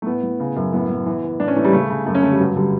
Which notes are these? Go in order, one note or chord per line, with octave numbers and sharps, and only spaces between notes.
A3
A2 B3
A2
C#3
F#2
A2 B3
A2
E3
E3
A2 D4
C#4
E3 A3
G3
C#3 A3
C#3
F#2 A3
C#4
D3 A3
G3
G2 F#3
D3 G3